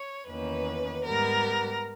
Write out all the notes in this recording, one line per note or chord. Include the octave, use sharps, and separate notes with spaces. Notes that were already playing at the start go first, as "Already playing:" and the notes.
Already playing: C#5
E2 D#3 A#3 C#4 B4
G#2 G3 B3 A#4